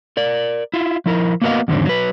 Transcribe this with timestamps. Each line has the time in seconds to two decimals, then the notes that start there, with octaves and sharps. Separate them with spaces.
0.17 A#4 D5
0.74 E4 F4
1.06 F3 E4 A#4
1.42 A#3 B3 F#4 A#4 D#5 F5
1.68 E2 G#2 D3 D#3 F#3 C4
1.85 F#3 B4